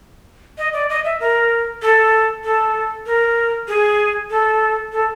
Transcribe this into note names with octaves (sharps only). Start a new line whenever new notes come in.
D#5
D5
D#5
E5
A#4
A4
A4
A#4
G#4
A4
A4